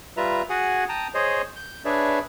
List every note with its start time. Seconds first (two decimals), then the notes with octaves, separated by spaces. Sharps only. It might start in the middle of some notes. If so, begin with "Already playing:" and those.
0.17 G3 F4 B4 E5 A#5
0.49 F#4 G#4 F#5 G#5
0.89 G5 A5 A#5 D#6
1.14 G#4 C5 C#5 D#5
1.56 G6
1.85 D4 G#4 B4 C#5 D5 E5